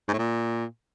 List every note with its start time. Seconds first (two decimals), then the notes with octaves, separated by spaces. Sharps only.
0.08 G#2
0.13 A2
0.18 A#2